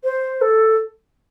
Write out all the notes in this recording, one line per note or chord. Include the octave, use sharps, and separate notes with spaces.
C5
A4